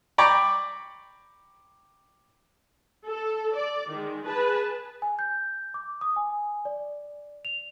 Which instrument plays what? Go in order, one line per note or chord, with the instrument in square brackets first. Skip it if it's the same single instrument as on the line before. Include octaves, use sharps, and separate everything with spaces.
[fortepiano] D5 G5 A#5 B5 C#6 D6
[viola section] A4
D5
D#3 G#3
G#4 B4 A5
[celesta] G#5
G6
D6
D#6
G#5
D5
F7